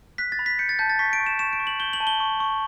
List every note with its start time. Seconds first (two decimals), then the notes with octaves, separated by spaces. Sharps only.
0.18 F#6 B6
0.32 A6
0.39 B5
0.46 B6
0.59 G6 C#7
0.69 A6
0.79 A5 G6
0.90 A6
0.99 C#6 B6
1.13 D7
1.20 C#6
1.26 E7
1.39 C#6 E7
1.53 D7
1.60 C#6
1.67 F#7
1.80 G6 G7
1.93 F#7
2.00 A5
2.07 G7
2.20 C#6
2.40 C#6